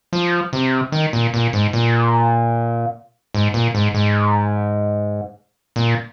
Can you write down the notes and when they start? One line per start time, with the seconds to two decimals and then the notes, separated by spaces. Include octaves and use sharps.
0.13 F3
0.53 C3
0.92 D#3
1.13 A#2
1.34 A#2
1.53 G#2
1.73 A#2
3.34 G#2
3.54 A#2
3.75 G#2
3.94 G#2
5.76 A#2